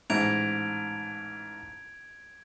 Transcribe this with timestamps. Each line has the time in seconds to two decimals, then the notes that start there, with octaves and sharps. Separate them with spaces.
0.10 A1 G#2 G#6 D7 F7